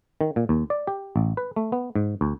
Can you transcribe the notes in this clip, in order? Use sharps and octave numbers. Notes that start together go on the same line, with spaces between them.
D#3
A#2
D#2
D5
G4
A1
B4
A3
B3
G#2
D2